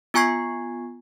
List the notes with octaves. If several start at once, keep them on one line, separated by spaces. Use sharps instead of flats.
B3 F4 G#5 C#6 G#6 C7